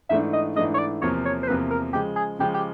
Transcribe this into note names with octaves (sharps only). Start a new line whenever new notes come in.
G#2 E3 A3 D4 E5
D#5
G#2 E3 A3 D4 D#5
C#5
D5
E2 C3 F3 A#3 C#5
C#5
C5
E2 C3 F3 A#3 B4
A#4
C#3 F3 G#3 G4
G#4
C#3 F3 G#3 G4
G4